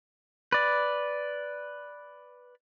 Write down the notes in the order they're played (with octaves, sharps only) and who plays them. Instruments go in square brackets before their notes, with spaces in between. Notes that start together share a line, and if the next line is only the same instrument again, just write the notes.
[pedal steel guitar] B4 D5